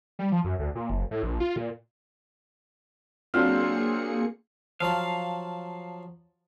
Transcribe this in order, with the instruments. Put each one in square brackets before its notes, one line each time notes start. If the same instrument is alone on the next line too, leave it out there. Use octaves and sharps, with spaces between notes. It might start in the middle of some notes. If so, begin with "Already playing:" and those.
[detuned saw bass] G3
F3
F#2
D2
A#2
F#1
A2
A#1
F4
A#2
[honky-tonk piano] F#3 C4 F4 [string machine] A#3 G#4 C#7 [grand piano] D4 [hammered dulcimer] F5
[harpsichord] F3 F#3 A5 [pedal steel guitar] F5